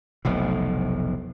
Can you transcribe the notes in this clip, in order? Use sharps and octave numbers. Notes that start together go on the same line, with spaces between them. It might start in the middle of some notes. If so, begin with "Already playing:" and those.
F1 B1 A2